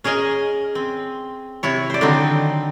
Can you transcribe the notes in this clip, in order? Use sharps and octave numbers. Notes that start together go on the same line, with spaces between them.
C#4 G#4 A#4 D#5 G#5
C4
C3 E4 C#5
C5 D5
D3 D#3 F#3 C4 D#4